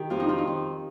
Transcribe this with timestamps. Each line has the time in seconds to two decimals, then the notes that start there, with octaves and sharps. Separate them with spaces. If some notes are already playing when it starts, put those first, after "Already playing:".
Already playing: D#3 G4
0.10 F2 F4
0.20 D#4
0.28 D#3 F4
0.38 D#4
0.47 F2